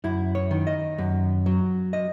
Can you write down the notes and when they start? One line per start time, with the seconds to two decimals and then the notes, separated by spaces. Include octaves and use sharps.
0.04 F#2 E4
0.35 C#5
0.51 D#3
0.67 D#5
0.98 F#2
1.46 F#3
1.93 D#5